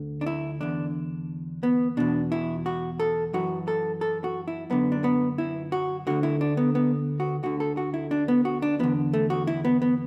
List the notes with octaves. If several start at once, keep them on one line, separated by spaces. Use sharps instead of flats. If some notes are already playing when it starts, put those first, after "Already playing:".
Already playing: D2 D3
D4
E4
E2 D3 D4
B3
E2 B2 D4
E4
F#4
A4
F#2 E3 F#4
A4
A4
F#4
E4
F#2 D3 B3
D4
B3
E4
F#4
D2 D3 F#4
E4
D4
B3
B3
F#4
D2 D3 F#4
A4
F#4
E4
D4
B3
F#4
D4
E2 D3 B3
A3
F#4
E4
B3
B3